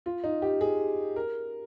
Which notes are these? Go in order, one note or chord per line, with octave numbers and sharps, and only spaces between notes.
F4
D#4
G4
G#4
A#4